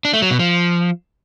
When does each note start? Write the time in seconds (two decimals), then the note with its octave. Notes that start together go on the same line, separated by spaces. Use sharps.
0.05 D4
0.13 A3
0.22 F#3
0.31 B2
0.39 F3